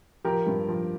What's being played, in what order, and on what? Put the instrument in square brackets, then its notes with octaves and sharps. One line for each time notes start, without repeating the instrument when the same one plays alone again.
[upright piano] F3 G4 A#4
G2
F3